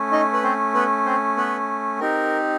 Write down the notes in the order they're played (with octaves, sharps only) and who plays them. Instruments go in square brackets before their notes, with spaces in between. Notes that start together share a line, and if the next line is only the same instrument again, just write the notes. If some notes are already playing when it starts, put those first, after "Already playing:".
Already playing: [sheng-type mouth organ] A3 C#4
D#4 D#5
B4
C4 C5
B3 B4
C4 C5
B3 B4
C4 D#4 G4 A#4